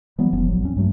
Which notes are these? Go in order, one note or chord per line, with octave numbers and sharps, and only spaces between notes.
E3 F#3 G3 B3
F1 F3 B3 C#4
A1 F#3
E2 C4 C#4
G2 F#3 A3